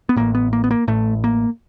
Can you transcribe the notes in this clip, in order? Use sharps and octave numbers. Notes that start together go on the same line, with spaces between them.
B3
A1 A2 A#3
B3
A#3
B3
A#3
A1 A2 A3
A#3